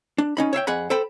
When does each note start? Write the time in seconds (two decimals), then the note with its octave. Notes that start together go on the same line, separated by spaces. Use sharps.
0.18 D4
0.37 C#4 D#4 B5
0.53 C#5 E5 F5 G5
0.67 F2 G#4 F#5 B5
0.90 A4 C5 G5 B5